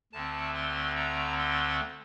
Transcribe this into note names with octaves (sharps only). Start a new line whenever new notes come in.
D2 D3 A3 C4 A5
C6
A#5
C6